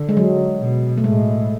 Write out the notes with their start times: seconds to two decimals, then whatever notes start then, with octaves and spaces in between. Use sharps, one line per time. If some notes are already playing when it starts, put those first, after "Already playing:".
Already playing: D3
0.09 G#3
0.17 F#3
0.60 B2
0.98 A3
1.04 A2 G#3